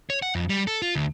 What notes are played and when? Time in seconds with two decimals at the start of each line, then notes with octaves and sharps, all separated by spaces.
0.10 C#5
0.22 F#5
0.35 F2
0.49 G3
0.67 A4
0.82 F4
0.96 D2